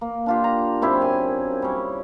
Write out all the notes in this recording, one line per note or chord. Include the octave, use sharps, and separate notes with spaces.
A#3
D4 F4 G4
A#5
F#2 C4 E4 G4
G#5
G3 C#4